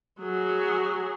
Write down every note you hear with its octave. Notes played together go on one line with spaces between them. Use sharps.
F#3 G#4